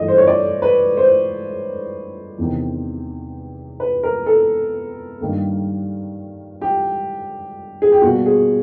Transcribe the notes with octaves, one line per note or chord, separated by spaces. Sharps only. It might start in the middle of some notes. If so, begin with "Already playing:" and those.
Already playing: G2 E3 A3 D#5
C5
C#5
D5
B4
C5
E2 C3 D#3
B4
A#4
A4
G2 D#3 G3 A#3
G4
G#4
G4
B2 G3 A#3 F#4
G#4